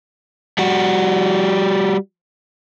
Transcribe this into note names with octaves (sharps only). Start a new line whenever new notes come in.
G3 F#4